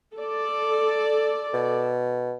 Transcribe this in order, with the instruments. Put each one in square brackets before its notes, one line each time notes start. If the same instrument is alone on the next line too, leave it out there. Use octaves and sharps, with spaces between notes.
[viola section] A4 D5
[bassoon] B2